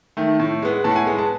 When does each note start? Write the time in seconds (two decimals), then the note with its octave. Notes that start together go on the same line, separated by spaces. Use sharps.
0.17 D#3 A3
0.40 A2
0.62 G#3 B3
0.84 A2 A5
0.91 F#5
0.96 G#5
1.07 G#3 B3
1.18 A5